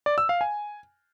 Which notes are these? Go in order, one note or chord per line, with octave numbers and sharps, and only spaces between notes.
D5
E6
F5
G#5